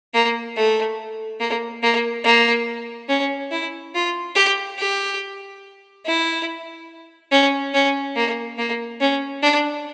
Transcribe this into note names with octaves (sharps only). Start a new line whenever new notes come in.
A#3
A3
A#3
A#3
A#3
C#4
E4
F4
G4
G4
E4
C#4
C#4
A#3
A#3
C#4
D4